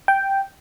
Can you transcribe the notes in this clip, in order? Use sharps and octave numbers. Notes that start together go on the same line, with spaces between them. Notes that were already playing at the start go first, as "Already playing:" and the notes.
G5